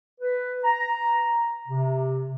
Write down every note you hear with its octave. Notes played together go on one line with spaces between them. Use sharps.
B4
A#5
C3